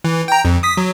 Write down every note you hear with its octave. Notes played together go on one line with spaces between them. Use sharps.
E3
G5 A#5
F2
D#6 B6
F#3